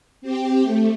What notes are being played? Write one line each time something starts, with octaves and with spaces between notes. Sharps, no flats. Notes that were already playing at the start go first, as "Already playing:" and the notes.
C4 G4
A3